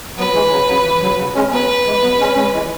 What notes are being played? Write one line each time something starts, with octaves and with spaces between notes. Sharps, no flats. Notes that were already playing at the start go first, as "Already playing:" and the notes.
F#3 B3 B4
E3 G#3
C#3 F#3
C#3 F#3
E3
C#3 F#3
C#3 F#3
G#3 C#4
F#3 B3 B4
E3 G#3
F#3 B3
G#3 C#4
G#3 C#4
E3 G#3